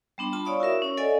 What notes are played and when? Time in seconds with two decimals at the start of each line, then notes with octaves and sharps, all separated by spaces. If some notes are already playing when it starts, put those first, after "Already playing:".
0.18 G3 B3 D4 C6
0.33 F4 A5 B5
0.45 C#5 D5 F5 C#6 D#6
0.60 E4 F#4 A#4 E5
0.82 C#4 C#5
0.97 A4 D5 D#5 F5 G#5